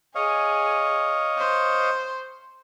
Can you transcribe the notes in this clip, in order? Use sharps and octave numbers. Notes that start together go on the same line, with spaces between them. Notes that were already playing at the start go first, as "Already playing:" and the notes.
G#4 C#5 D#5 F5
C5